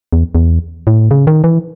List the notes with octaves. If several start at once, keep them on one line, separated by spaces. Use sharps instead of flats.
E2
E2
A2
C#3
D#3
E3